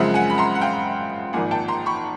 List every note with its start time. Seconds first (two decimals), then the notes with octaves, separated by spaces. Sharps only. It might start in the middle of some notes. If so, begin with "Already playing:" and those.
Already playing: F#2 C#3 F3 G#3 C4 E5 F#5
0.14 F#5 G#5
0.30 B5
0.38 A#5 C6
0.55 F#5
0.62 F5 G5
1.33 G#1 G#2 F3 A#3 F#5 G#5
1.51 G5 A5
1.68 A#5 C6
1.86 B5 C#6